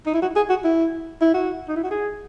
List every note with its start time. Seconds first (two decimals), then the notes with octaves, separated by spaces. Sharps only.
0.06 D#4
0.14 E4
0.22 F#4
0.36 G#4
0.50 F#4
0.64 E4
1.22 E4
1.34 F#4
1.68 D#4
1.76 E4
1.84 F#4
1.91 G#4